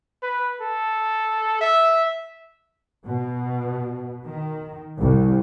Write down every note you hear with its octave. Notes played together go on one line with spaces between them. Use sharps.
B4
A4
E5
B2
D#3
C2